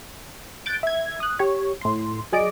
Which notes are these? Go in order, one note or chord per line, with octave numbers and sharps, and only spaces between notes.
F#6 G6 A6 D7
E5 G#6
D#6 F#6
G4 C#5
A2 C6
F#3 G#4 D5 D#5 D7